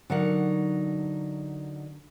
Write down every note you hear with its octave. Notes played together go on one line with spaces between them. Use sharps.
D3 F#3 D#4 A#4 F#5